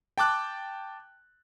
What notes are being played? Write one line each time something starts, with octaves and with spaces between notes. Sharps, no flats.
G5 A5 D6 F#6